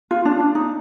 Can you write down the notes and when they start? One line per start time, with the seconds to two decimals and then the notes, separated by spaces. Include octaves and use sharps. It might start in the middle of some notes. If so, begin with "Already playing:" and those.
0.11 F4
0.25 D4
0.40 D4
0.55 D#4